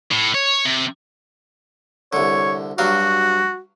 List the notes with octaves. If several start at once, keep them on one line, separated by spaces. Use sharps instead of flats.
A2
C#5
C3
C2 D3 C#5
G2 F#3 F#4 F5